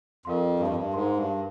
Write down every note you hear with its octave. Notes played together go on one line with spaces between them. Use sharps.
F2 A#4 F5 C6
G2
F2
G2
G#2 A#4 F5 C6
G2